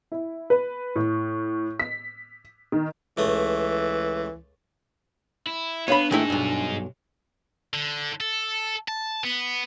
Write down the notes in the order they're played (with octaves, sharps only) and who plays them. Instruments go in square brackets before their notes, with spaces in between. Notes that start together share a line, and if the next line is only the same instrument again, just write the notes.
[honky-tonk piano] E4
B4
A2
B6
D#3
[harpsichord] C#2 A3 D#6 [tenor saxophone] E3
[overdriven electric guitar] E4
[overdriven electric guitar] B3 [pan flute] D4 [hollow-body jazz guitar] C#5 F5 B5
[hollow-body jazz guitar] D#3 A3 E4 [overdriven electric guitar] D#4 G#4
[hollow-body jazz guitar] B1 G2
[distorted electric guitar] D3
A4
A5
B3